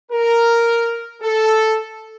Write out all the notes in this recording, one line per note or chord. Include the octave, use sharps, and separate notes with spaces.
A#4
A4